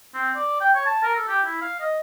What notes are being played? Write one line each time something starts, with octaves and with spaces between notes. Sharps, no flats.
C4
D5
G5
C#5
A5
A#4
A4
G4
E4
F5
D#5